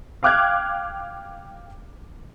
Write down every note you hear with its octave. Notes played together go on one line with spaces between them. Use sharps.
F5 G5 D6 F6 F#6 G#6